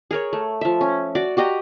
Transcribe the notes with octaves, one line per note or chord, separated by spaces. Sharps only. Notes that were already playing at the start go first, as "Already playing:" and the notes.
G#4 A#4 C#5
A3
F3 E5
C#4
F#4 D5
F#4 G4 D#5 A#5